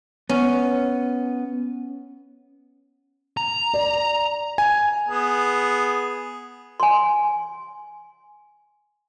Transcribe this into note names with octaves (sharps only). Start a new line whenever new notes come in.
B3 C#4
A#5
D5
G#5
B3 G#4
G#5 C6